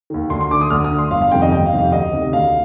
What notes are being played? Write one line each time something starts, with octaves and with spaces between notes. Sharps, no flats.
D#2 D#3
D2 C6
C6
D3 D6
D#6
D2 F6
D#6
D3
C6
G1 F5
F5
F2 C3 D#3 G5
D#5
G1 G5
F5
F2 C3 D#3
F5
D2 D#5
C3 D#3
D2 F5